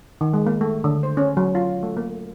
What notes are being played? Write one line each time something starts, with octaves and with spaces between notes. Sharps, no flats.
D#3
G#3
A#3
A3
D3
C5
C#4
F#3
F4
A3
A#3